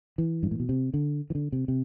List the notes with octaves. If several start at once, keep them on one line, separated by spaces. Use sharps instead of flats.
E3
G2
A2
B2
C3
D3
E3
D3
C3
C3